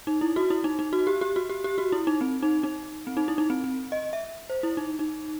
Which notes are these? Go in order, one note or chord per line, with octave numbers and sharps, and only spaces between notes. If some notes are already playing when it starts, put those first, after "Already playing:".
D#4
E4
F#4
E4
D#4
D#4
F#4
G4
G4
F#4
G4
G4
F#4
E4
D#4
C4
D#4
D#4
C4
D#4
E4
D#4
C4
C4
D#5
E5
C5
E4
D#4
D#4